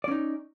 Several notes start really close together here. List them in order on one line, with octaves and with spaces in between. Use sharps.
D5 C#4 D#4